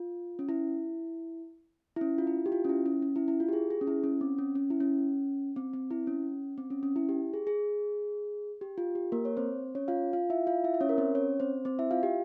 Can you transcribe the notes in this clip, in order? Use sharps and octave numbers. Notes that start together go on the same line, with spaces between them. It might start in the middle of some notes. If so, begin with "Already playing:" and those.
Already playing: F4
C#4
E4
E4
C#4
F4
E4
G4
F4
C#4
E4
C#4
C#4
E4
E4
F4
G4
G#4
G#4
C#4
E4
C#4
C4
C#4
C#4
E4
C#4
C4
C4
E4
C#4
C4
C#4
C#4
E4
G4
G#4
G#4
G4
F4
G4
A#3 A#4
C#5
C4 C5
C#4 C#5
F4 F5
F4 F5
E4 E5
F4 F5
E4 E5
E5
C#4 C#5
A#4
C4 C5
C#4 C#5
C4 C5
C4 C5
E4 E5
F4 F5
G4